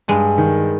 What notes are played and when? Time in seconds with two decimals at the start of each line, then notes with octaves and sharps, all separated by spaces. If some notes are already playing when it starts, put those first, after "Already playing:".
0.08 G2 G#3
0.38 D#3